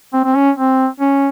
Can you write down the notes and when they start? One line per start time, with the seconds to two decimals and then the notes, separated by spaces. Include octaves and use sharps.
0.13 C4
0.24 C4
0.35 C#4
0.57 C4
1.00 C#4